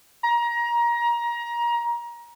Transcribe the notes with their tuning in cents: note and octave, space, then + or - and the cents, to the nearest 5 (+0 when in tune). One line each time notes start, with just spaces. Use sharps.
A#5 +25